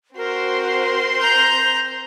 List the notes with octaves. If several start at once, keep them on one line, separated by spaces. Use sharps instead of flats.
C4 F#4 A#4 C5 C6
A#5 G6